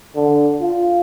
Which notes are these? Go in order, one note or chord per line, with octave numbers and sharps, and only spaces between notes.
D3
F4